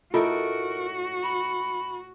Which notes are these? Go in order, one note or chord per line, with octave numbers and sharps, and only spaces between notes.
A2 D#4 F4 F#4 A4 A#4
B5